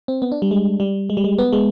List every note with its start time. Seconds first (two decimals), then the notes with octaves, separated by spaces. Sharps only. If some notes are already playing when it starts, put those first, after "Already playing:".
0.08 C4
0.22 B3
0.32 D4
0.42 G3
0.51 G#3
0.80 G3
1.10 G#3
1.17 G3
1.24 G#3
1.39 B3
1.53 G#3